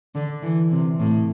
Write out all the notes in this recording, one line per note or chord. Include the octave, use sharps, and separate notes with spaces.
D3
E3
C3
A2